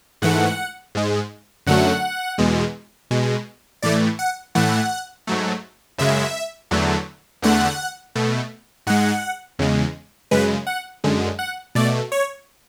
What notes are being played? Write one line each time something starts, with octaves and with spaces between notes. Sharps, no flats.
G#2 E3 A3 F#5
G#2 G#3
F#2 D3 F#3 A3 F#5
E2 B2 G#3
B2 G#3
A2 E3 A3 D5
F#5
A2 E3 A3 F#5
G#2 F#3 A3
F#2 C#3 G#3 E5
E2 D3 F#3 A3
E2 D3 A3 F#5
B2 A3
G#2 G#3 F#5
E2 C#3 G#3
F#2 C#3 G#3 B4
F#5
F#2 D3 G#3
F#5
B2 A3 D5
C#5